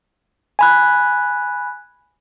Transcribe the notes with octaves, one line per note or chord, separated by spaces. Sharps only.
G#5 B5 F#6